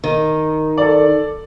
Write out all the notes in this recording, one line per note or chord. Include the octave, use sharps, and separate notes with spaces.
D#3
A4 D5